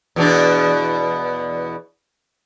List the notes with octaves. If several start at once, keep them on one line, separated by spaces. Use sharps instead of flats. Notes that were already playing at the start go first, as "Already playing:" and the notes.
E2 B2 D4